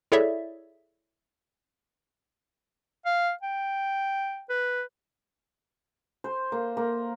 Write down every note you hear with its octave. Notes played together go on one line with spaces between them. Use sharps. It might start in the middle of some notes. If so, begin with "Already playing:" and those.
E4 G#4 A4 C#5 D5 E5
F5
G5
B4
C5
A#3
A#3